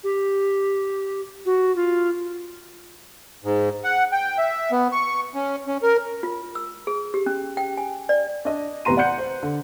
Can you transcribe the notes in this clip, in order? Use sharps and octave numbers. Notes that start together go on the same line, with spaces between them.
G4
F#4
F4
G#2
F#5
G5
E5
B3
C#6
C#4
C#4
A#4
F4
E6
G#4
G4
C#4
G5
G#5
D5
D4 D#5
A1 C3 B3 A#5 C6 D#7
D5 F#5 C6 F#6 G6 C#7
C5
D3